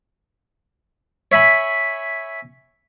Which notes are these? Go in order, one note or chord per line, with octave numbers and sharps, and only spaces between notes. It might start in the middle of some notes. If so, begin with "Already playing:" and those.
C#5 E5 G#5 B5